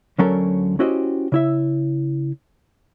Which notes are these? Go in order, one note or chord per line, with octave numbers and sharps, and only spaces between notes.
D2 D3 F#3 C#4 A4 A#4
C#4 E4 F#4 G4 C5 D#5
C#3 E4 E5